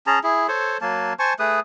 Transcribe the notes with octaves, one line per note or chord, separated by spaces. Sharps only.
C#4 G#4 A5 A#5
E4 G#4
A4 C5 C#5
F#3 A#3 A5
C5 G#5 A5 C#6
A3 G#4 B4 D#6